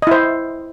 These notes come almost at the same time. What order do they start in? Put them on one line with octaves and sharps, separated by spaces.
D#5 E4 C5